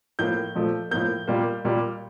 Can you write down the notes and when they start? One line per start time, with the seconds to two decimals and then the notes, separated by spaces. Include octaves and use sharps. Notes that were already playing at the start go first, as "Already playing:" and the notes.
0.19 A2 F3 A#3 G6
0.55 A#2 F3 A3
0.91 A2 F3 A#3 G6
1.28 A#2 G3 A#3
1.65 A#2 G3 A#3